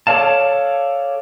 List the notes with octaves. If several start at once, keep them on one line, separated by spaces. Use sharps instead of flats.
A4 C#5 D5 F5 A5